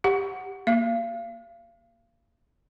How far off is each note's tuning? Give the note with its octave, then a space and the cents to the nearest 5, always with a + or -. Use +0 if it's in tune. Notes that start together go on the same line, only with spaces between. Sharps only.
G4 +0 F#5 +0
A#3 +0 F5 -35